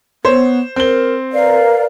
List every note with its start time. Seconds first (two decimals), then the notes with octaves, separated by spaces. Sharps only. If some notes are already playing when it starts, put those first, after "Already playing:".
0.25 B3 C5 C#5
0.76 C4 A#4 G7
1.33 A#4 B4 D5 F5